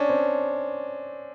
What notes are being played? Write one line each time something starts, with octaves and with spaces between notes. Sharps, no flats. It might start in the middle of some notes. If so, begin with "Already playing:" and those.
Already playing: C#4 D4
C4